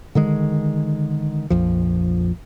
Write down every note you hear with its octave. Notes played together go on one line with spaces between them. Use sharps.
D3 D#3 G#3
A#1 F2 F3